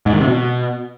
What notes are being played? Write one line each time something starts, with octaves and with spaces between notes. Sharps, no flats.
G#2
D#3
C3
B2